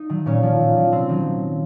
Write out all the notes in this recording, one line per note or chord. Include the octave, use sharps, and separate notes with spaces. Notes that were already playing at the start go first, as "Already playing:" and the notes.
Already playing: D#4
D#3 F#3
A#2 C#4
F3
A#2
F3
C3 C4
D#3 F#3